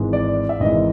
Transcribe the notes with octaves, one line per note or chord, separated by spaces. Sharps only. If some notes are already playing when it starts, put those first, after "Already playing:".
Already playing: G#1 G#2 E3 G#3
D5
E5
G#1 G#2 E3 G#3 D#5